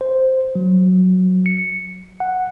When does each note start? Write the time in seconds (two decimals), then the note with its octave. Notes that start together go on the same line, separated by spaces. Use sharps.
0.01 C5
0.55 F#3
1.46 C#7
2.20 F#5